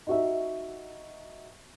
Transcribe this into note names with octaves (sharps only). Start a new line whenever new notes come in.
D#4 F#4 E5